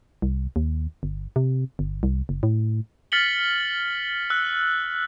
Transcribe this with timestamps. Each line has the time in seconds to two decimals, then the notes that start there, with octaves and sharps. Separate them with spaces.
0.22 C2
0.56 D#2
1.03 G1
1.36 C3
1.79 G1
2.03 C2
2.29 F#1
2.43 A2
3.12 F6 A6 B6 C#7 F#7 G7
4.30 E6 F#6